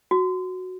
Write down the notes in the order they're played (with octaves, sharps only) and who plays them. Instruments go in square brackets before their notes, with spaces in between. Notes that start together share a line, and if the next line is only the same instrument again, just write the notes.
[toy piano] F#4